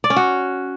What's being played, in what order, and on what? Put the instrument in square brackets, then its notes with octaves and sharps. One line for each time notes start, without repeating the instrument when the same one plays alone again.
[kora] D5
C#4
F#4